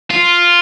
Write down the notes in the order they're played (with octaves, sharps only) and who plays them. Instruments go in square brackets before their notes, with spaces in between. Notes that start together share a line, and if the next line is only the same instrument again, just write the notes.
[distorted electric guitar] F4